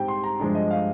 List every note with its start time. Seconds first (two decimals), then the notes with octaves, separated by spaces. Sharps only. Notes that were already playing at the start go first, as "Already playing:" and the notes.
Already playing: G#2 G3 C4 G5
0.08 C6
0.24 A#5
0.40 G2 F3 G#3 D4
0.55 D#5
0.71 F5